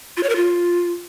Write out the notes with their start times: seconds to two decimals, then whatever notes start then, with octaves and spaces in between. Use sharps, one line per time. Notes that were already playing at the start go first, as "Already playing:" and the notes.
0.17 F4
0.23 C#5
0.29 A#4
0.36 F4